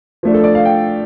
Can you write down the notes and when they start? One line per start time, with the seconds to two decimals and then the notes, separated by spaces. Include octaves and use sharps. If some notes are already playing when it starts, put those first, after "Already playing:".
0.23 F3 A3 D4
0.34 A4
0.44 D5
0.55 F5
0.65 G5